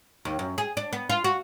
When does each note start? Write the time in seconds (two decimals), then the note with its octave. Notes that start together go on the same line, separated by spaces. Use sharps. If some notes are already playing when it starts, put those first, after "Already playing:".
0.25 D#2
0.39 F#2
0.58 G#4
0.77 D4
0.93 B3
1.10 F4
1.24 F#4